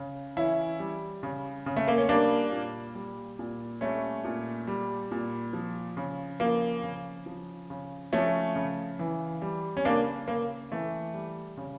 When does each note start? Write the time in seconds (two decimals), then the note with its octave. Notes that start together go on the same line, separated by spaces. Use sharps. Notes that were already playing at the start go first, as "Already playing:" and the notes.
Already playing: C#3
0.36 E3 C#4 E4
0.79 G3
1.23 C#3
1.66 C#3
1.77 A3
1.88 A#3
1.98 C#4
2.09 G3 A#3 D4
2.52 A#2
2.95 G3
3.39 A#2
3.81 G3 A3 C#4
4.24 A#2
4.67 G3
5.11 A#2
5.53 F3
5.97 C#3
6.40 F3 A#3
6.83 C#3
7.26 F3
7.70 C#3
8.13 F3 A3 C#4
8.56 C#3
8.99 E3
9.42 G3
9.77 C#4
9.85 C#3 A#3 D4
10.28 C#3 A#3
10.72 E3 A3
11.14 G3
11.57 C#3